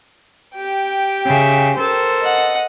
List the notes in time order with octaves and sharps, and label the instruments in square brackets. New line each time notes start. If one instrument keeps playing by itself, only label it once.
[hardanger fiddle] G4 G5
[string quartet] C#3 E5
A4 A#4 C5
[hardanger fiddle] D#5 F#5